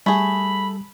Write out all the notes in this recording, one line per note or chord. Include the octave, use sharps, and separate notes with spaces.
G3 A3 G#4 B5